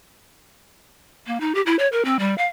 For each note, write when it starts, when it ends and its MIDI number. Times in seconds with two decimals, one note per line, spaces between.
1.27 1.40 58
1.40 1.53 63
1.55 1.62 67
1.66 1.76 64
1.79 1.88 73
1.92 2.03 70
2.05 2.17 60
2.19 2.35 55
2.38 2.46 77